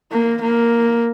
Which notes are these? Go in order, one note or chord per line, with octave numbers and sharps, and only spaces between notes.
A#3
A#3